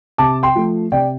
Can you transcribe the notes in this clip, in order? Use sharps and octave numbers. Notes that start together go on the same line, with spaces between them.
C3 A5 D6
G5 C6
F3 A3
C3 D5 G5